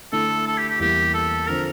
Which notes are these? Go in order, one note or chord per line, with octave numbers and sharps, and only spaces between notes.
D3 A3 E4 A4
A4
G4
G4
E2 E3 G3 A#3 E4 G4
A4
D3 F3 C4 A#4